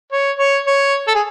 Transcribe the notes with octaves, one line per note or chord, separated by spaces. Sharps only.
C#5
C#5
C#5
A4
G#4